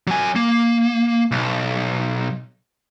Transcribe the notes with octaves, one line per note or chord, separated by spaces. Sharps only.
F#3 G#5
A#3
B1